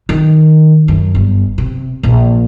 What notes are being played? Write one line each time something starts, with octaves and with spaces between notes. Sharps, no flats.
D#3
F#2
G1
C3
A#1